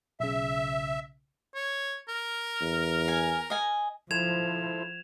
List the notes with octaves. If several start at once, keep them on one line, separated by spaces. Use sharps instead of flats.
B1 C#3 E5
C#5
A#4
E2
G#5
D#5 G#5
F3 E4 A4 C5 G#6 E7 F7